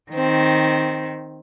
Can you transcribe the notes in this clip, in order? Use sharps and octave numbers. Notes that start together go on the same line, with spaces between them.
D#3 C4